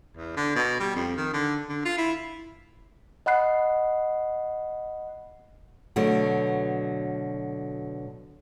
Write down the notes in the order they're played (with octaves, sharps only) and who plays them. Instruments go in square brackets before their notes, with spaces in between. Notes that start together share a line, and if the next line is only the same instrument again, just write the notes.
[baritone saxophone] E2
D3
B2
G3
F2
D#3
D3
D3
F4
E4
[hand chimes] D#5 F#5 B5 F#6 C7
[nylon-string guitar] B2 D3 F#3 A3